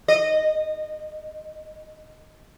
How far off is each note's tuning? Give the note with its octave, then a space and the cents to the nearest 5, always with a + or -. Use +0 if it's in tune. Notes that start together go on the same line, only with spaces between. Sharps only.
D#5 -25